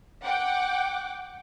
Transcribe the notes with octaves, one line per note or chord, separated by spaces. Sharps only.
F#5 G5 D6